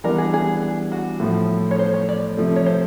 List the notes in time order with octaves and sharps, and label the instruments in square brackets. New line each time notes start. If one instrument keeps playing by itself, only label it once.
[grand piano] E3 G3 B3 D4 [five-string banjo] A#4
[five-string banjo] G#4
G#4
G#4
F#4
[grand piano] A2 F3 A3
[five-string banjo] C#5
C5
C#5
D5
[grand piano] C3 F3 A3
[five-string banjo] C#5
C5